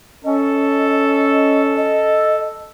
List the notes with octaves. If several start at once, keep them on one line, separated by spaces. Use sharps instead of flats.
C#4 A4 D#5
D#5